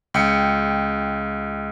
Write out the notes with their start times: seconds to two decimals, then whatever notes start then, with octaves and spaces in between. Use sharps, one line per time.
0.14 C#2 G5 C#7